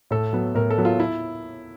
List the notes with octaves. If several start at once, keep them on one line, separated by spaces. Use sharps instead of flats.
A2 A4
F#3 B3
A2 A#4
A4
F#3 B3
F4
E4